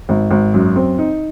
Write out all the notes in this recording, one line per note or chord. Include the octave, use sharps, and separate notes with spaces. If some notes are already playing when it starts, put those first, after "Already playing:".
G#1
G#1
F#2
C4
D#4